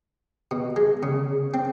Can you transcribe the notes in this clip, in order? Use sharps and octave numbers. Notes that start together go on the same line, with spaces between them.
B2
G#3
C#3
C4